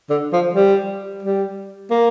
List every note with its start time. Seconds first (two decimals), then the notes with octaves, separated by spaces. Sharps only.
0.10 D3
0.33 F3
0.55 G3
1.23 G3
1.91 A#3